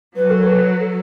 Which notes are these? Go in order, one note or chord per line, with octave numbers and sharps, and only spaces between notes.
F#3 B4
A4
B4
A4